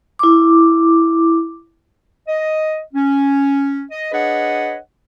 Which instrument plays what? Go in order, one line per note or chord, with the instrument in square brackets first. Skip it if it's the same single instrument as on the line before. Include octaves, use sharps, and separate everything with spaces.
[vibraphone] E4 D6
[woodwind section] D#5
C#4
D#5
D4 G#4 B4 C#5 D#5 F#5